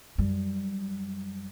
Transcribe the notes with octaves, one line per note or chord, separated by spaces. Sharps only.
F#2 G3